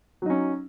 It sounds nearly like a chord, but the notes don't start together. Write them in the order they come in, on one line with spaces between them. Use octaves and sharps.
F#3 D#4 C#4